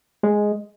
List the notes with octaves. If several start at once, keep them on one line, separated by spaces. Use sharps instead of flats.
G#3